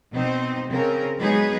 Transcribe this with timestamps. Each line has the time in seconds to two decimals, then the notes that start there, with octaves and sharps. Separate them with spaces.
0.12 B2 C4 D#4 C5
0.69 C#3 C4 A#4
1.19 F#3 G#3 B3 D#4 G#4 B4